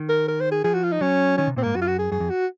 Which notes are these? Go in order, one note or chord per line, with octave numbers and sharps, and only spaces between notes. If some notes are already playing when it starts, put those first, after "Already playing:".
Already playing: D#3
A#4
A#4
C5
G#4
F3 G#4
F#4
F4
D#4
F#3 C#4
D#3 C#4
C3
A#2 C4
G#2 A#3
F#2 F#4
F4
F#4
G#4
F#2 G#4
F2
F#4